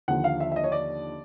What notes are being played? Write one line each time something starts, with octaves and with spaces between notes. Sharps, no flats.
D#2 D3 F3 F#5
F5
E5
E5
D#5
C#5
D5